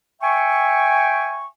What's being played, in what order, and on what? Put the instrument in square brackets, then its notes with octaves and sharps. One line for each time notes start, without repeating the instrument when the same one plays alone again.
[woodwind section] E5 G5 G#5 C#6